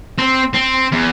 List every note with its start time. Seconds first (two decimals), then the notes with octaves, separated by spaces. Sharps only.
0.18 C4
0.53 C4
0.92 E2